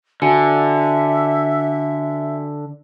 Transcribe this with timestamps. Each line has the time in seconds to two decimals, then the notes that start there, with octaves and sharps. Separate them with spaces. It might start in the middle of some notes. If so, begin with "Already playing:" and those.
0.22 D3 F#4 E5 G#5 C#7